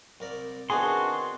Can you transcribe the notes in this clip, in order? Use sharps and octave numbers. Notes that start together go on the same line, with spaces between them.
C2 A#4 D5
D#3 B3 C4 D4 F#4 G#4 C6